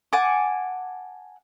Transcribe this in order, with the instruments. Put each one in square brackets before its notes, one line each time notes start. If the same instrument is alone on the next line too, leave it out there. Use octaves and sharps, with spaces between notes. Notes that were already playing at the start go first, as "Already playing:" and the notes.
[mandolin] F#5 G#5 A5 D6